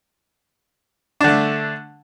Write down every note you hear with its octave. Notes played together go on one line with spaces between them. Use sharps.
D3 A3 D4